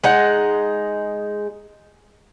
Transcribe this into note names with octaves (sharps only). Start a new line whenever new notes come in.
G#3 D#4 F#5